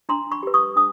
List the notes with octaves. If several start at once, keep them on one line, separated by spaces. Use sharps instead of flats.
D4 A#5 C6
B5 C#6
G4 B4
C#6 D#6
D4 D#6